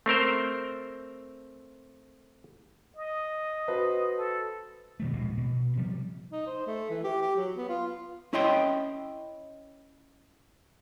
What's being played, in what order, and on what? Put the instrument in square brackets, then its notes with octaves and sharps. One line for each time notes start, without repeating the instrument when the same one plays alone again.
[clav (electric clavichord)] A3 C4 A#4 C5
[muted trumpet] D#5
[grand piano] F#4 B4 C5
[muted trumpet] A4
[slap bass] B2 D#3 A3
D#1 A#1 B2 G#3
B2
C3 F3 G3
[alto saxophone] D#4
C5
A3
E3
G4
G4
F#3
B3
F4
[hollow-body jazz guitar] C#4 E4 C#5 D#5 G5 C6